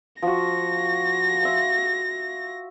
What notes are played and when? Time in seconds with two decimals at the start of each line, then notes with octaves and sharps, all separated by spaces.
0.22 F3 F#4 A#6
1.43 E5 C6